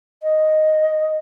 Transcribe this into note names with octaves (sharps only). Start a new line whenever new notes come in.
D#5